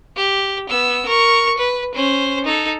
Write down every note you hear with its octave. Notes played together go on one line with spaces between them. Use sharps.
G4
B3 E6
A#4 C#6
B4
C#4 C5
D#4 A4